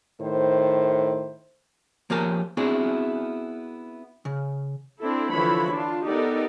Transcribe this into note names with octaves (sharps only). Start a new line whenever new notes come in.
A2 D#3 C5
F3 A#3 C#4 G4 A#4 A5
B3 C4 D4 E4 F#4 G#4
C#3
C4 D4 E4 A4
D3 E3 F3 E4 C#5 B5
D4 F4
B3 D#4 G4 A4 A#4 D5